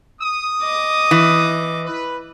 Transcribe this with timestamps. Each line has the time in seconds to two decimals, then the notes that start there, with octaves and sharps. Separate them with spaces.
0.21 D#6
0.63 D#5 D6
1.11 E3
1.85 B4